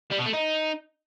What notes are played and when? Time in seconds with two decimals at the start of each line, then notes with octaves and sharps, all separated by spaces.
0.12 G3
0.19 B2
0.26 A3
0.33 D#4